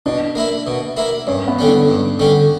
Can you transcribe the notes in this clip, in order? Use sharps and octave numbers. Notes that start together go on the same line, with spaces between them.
B2 D4
A#3 E4
B2
A#3 E4
G2 C#4
B3
D3 G3 C#4
D4
G2
D3 G3 C#4